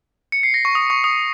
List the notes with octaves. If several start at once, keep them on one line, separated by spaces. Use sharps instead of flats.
C#7
C7
A#6
C#6
D#6
C#6
D#6